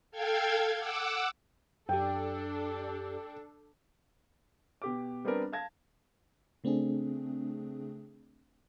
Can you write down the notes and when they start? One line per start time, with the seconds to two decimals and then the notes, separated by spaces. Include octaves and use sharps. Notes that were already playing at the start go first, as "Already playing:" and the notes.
0.11 A4 F5 G5 G#6
0.78 F#5 D6 E6
1.89 F#2 D4 G4 A4 G5
4.82 B2 G4 D6
5.25 G3 B3 C4 D4 A#4 B4
5.52 F5 A5 G#6 A#6
6.64 C#3 A3 C4 D4 G#4